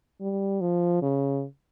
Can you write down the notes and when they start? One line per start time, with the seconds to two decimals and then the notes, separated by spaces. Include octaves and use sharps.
0.21 G3
0.61 F3
1.02 C#3